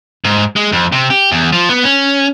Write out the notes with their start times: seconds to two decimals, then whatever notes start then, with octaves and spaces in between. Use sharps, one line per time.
0.25 G#2
0.56 G#3
0.72 F2
0.92 C3
1.10 G4
1.32 E2
1.52 F3
1.69 B3
1.84 C#4